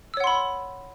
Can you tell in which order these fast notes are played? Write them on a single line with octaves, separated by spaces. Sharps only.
E6 C#5 F#5 C6 B5